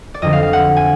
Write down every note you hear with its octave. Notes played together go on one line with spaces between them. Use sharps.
D5
F2 D3 F#3 D#5
F5
F5
F#5
G#5